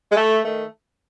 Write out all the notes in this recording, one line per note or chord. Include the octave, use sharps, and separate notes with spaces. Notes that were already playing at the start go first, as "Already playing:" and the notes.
G#3
A3
D#3 A3